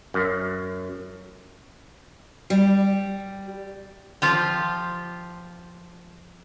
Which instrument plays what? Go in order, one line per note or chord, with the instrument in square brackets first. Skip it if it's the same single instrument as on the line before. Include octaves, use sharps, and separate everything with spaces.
[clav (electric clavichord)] F#2
[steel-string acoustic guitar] G3
[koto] F3 F4 G4